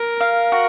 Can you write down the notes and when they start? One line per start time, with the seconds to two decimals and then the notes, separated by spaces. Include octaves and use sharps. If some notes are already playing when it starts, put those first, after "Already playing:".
Already playing: A#4
0.21 F5
0.52 F#4